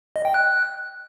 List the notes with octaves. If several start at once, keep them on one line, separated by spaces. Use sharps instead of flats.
D#5
G5
F#6